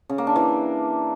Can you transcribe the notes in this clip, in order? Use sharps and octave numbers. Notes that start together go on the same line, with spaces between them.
C#3
A#3
D4
E3